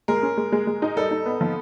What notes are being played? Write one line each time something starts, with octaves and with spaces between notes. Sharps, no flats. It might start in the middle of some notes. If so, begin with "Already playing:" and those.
G#3 A#4
C#4
G#3
G#3
G#3
D#4
G3 A4
D#4
B3
F3